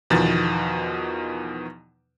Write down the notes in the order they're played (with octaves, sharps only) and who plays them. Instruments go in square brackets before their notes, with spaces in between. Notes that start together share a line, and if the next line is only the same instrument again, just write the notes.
[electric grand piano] E2 B2 D#3 F3 A6